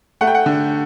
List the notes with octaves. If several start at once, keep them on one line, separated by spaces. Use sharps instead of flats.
A3 F#5
G5
F#5
D3